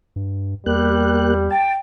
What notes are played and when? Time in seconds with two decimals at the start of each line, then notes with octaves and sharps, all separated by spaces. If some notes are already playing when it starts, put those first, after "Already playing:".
0.16 G2
0.66 E2 G3 A#3 G4 F#6
1.51 G5 A5